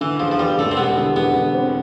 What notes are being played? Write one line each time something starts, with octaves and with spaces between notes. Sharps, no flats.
D3 E3
E2 F3
F3
E2 G3
E1 A3
C4
G3 B3
D3
E2 B3
D3
C4